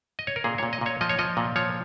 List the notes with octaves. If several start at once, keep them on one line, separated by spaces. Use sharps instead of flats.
D#5
C#5
A#4
A#2 G#4
A#2 C#5
D#5
A#2 C#5
F3 D#5
C#5
F3 D#5
A#2
F3 C#5